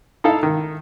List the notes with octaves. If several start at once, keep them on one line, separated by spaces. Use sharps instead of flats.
D#4 E4 A4 F5
D#3